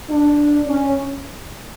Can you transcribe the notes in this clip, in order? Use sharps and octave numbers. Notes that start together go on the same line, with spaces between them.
D4
C#4